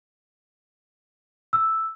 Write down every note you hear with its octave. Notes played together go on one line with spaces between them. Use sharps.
E6